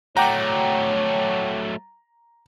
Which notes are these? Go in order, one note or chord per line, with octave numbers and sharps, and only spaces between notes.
F#3 A3 C#5 F#5 G5 A#5 D6